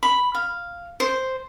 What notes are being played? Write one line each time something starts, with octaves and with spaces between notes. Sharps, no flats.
B5
F5
C5